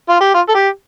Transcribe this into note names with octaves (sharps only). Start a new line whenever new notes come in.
F4
G4
F4
A4
G4